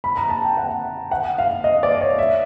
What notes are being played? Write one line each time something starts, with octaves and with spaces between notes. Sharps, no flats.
B5
A#5
A5
G5
F#5
F#5
F5
D#5
D5
C#5
E5